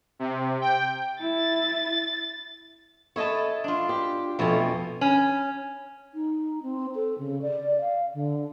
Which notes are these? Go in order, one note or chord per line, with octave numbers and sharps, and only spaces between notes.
C3
G5
E4 A6
E4 A4 C#5 D#5 A5
D4 F4
G4
F2 B2 A3 C#4
C#4
D#4
C4
A4
C#3
D5
F5
D3